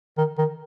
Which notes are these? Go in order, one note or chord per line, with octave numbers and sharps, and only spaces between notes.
D#3
D#3